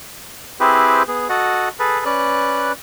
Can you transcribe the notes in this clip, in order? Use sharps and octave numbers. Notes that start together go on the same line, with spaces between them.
C4 E4 G4 G#4 B4 C5
B3 G#4
F#4 A4 D#5 F#5
G#4 A4 B4
C#4 B4 D5 F#6